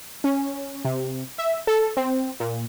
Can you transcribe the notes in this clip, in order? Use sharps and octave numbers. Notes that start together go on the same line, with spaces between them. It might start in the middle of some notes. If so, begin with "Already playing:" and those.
C#4
C3
E5
A4
C4
A#2